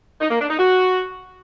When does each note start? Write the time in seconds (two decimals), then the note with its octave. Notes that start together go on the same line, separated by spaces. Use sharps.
0.21 D#4
0.31 A#3
0.40 D4
0.50 D#4
0.59 F#4